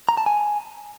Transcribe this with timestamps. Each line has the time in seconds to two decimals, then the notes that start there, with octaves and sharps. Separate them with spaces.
0.09 A#5
0.17 A5
0.26 G#5